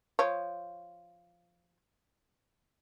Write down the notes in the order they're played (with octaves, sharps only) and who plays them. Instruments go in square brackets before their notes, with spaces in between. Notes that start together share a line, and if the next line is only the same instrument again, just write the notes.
[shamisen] F3 C#5